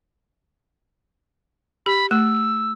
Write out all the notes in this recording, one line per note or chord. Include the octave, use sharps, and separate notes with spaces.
G4 B5
A3 E6